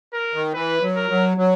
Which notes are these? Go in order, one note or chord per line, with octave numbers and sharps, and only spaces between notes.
A#4
D#3
E3 B4
F#3
A#4
F#3
F#3